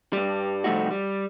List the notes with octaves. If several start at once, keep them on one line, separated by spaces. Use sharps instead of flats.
G2 G3
C3 F3 G3 A3 D#4 F#4
G3